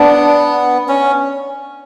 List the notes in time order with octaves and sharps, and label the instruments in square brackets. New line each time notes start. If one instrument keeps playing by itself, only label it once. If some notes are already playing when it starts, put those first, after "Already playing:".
Already playing: [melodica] B3 [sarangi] D4
[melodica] C#4